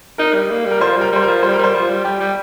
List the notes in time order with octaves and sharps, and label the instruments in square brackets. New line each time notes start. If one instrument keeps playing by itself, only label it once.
[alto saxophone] D#4 [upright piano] A#4
[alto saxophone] G3
A#3
G3
[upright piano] A#4
[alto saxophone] F3 [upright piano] C5
[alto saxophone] G3 [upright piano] A#4
[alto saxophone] G3 [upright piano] C5
[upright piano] A#4
[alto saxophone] F3
[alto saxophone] G3 [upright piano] C5
[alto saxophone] G3 [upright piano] A#4
[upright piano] C5
[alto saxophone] F3
G3
[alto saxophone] G3 [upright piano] G4
[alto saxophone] G3